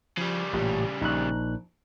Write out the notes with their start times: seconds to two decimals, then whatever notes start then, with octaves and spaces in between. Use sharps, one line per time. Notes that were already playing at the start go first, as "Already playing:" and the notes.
0.17 C#3 F3 G3
0.53 A1 A#2 G4
1.01 A#1 D#4 F#6